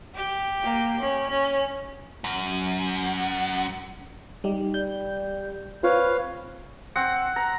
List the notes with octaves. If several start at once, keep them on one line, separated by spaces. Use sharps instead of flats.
G4
A#3
C#4
C#4
F#2
G3 D#4 G4
G3 G6
C4 F4 B4 C#5 F5
C4 F#5
A#5